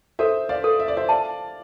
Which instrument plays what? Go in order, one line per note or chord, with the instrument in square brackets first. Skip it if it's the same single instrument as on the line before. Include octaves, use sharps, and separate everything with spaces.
[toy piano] A4 [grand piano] C5 E5
[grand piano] D5 F5
[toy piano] A4
[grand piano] E5
D5
C5 E5
[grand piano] D5 F5 [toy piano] A5